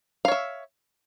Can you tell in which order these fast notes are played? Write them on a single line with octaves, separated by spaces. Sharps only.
F5 C#5 E5